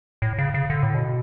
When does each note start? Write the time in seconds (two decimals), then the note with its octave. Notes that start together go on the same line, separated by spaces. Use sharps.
0.22 A2
0.38 C#3
0.54 C#3
0.70 D3
0.83 A2
0.94 B2